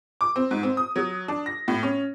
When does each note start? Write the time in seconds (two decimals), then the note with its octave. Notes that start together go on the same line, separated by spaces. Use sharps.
0.21 D6
0.36 C4
0.51 G#2
0.63 C4
0.77 D#6
0.96 F#3
1.28 D4
1.46 A#6
1.68 A2
1.83 C#4